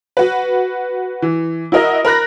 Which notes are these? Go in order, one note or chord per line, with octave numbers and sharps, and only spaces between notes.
F#4 B4
E3
E4 F#4 A#4 D#5
A#4 B5 F#6 A#6